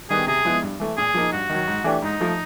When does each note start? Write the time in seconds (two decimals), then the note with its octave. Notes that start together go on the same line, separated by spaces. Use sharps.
0.10 D#3 G3 B3 G#4
0.27 C3 G#4
0.45 F3 G#3 B3 E4
0.62 G2
0.80 E3 A3
0.97 A#2 G#4
1.14 F3 A#3 D#4
1.32 G2 F#4
1.49 D#3 F#3
1.68 G#2
1.84 E3 A3 D4 G4
2.02 G#2 D#4
2.20 F3 A3